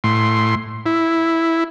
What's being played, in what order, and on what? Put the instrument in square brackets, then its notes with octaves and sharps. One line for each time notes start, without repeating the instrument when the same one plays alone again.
[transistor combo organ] A2 C6
E4